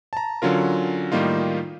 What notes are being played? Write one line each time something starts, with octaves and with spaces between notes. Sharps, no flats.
A5 A#5
D3 F#3 C#4 F4 A#4
A2 D#3 G3 A#3 D#4 F4